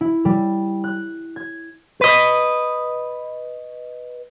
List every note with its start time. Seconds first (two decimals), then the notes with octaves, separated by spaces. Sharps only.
0.01 E4
0.25 G3
0.84 F#6
1.36 G#6
2.01 B4 D#5